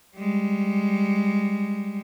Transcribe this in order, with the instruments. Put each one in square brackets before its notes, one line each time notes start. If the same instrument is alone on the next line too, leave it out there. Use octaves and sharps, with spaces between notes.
[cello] G3 G#3